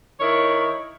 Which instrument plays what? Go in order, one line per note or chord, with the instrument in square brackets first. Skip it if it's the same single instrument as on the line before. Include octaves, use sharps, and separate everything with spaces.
[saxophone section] D#3 E4 C#5